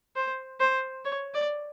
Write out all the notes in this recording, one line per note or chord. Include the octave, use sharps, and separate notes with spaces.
C5
C5
C#5
D5